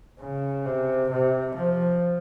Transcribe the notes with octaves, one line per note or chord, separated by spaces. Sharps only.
C#3
C3
C3
F3